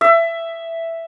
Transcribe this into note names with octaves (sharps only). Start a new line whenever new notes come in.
E5